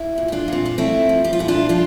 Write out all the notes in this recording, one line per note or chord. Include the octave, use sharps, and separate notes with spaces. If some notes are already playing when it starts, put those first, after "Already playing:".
Already playing: E4
A#2
G4
D4 F4
A#2 C4
D4
A3 C4 E4
F3
G4
F4
A#2 E4
D4 F4
F3 D4 F4